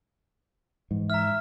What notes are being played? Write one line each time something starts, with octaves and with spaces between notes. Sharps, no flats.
G#2 E3
E5 A#5 F6